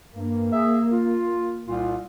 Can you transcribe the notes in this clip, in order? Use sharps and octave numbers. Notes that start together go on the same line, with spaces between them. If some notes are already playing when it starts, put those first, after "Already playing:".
G2 A#3
G#4 E5
F4
C2 A#2 F4